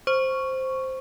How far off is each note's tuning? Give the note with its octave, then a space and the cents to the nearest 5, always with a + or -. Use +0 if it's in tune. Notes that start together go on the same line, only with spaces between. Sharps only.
C5 +0 C#6 +0